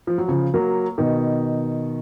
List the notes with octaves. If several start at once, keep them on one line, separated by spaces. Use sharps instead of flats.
F3
F#3
C#3 F3
F#3 A#3
B2 D#3